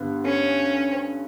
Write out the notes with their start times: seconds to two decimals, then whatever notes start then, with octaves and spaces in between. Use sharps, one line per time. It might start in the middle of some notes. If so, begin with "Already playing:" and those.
Already playing: G2 D3 B3
0.25 C#4